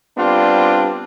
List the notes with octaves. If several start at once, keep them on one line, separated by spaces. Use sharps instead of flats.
G3 B3 C4 D4 F4